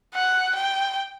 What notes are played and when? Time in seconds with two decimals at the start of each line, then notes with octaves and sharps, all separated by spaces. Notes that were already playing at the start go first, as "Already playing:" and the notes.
0.14 F#5
0.55 G5